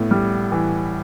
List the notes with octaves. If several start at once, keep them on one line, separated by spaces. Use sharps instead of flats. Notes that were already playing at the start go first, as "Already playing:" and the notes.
Already playing: A2 B3
G3
E3